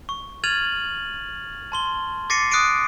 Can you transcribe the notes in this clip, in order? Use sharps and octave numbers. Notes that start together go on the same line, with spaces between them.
C#6
F6 G#6 A6 D#7 F7 F#7
A5 C6 G7
D6 A6 A#6 C7 C#7 D#7
D#6 F#6 C7 D7 D#7